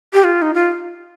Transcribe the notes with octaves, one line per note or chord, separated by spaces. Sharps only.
G4
F4
D#4
F4